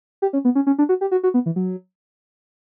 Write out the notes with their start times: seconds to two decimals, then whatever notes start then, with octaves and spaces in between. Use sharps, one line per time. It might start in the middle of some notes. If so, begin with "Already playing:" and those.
0.22 G4
0.33 C#4
0.45 B3
0.55 C#4
0.67 C#4
0.78 D4
0.89 F#4
1.01 G4
1.11 F#4
1.23 F#4
1.34 B3
1.46 E3
1.56 F#3